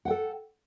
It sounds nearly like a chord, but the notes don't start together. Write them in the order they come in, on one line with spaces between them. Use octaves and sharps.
F#5 G5 A4